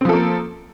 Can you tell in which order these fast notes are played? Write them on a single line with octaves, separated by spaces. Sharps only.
C4 F3 A4 A#3